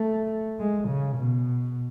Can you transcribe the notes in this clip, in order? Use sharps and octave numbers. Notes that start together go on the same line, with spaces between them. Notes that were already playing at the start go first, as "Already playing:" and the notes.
Already playing: A3
G#3
C#3
B2